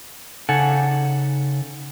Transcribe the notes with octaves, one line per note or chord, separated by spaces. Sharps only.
C#3 D#4 A4 F#5 G#5